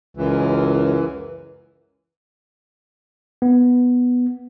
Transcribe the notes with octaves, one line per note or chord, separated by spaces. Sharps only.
C#2 F#2 E3
B3